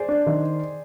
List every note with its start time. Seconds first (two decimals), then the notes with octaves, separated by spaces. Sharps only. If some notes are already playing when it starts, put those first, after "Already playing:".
Already playing: G#4 C5 D5
0.09 D4
0.27 D#3